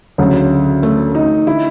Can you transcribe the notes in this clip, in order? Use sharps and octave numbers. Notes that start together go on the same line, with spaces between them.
D2 C#3 F#3
A3
D#4
D3 E4